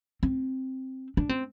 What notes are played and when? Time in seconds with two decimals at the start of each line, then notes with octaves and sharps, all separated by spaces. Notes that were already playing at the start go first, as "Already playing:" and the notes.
0.23 C4
1.17 D4
1.29 C4